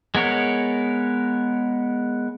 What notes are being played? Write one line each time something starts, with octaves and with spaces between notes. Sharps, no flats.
G#3 B3 A#4 C#5